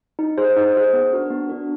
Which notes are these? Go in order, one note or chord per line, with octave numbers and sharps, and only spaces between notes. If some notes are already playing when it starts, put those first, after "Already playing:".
D#4
G#4 C5
D#4
G#4 C5
B3
D4 F#4 A#4
B3
D4 F#4 A#4